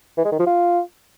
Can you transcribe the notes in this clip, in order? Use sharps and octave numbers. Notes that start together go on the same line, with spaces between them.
E3
G#3
D#3
F3
F4